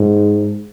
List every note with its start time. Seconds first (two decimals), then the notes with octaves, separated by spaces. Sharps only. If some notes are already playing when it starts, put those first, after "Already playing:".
Already playing: G#2